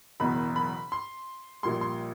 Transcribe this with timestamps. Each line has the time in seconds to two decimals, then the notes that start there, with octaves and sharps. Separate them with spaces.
0.20 F#1 E2 B2 B5
0.56 B5
0.92 C6
1.63 A#1 A#2 G3 C6
1.81 C6